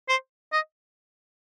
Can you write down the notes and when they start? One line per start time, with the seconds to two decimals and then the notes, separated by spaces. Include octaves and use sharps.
0.09 C5
0.52 D#5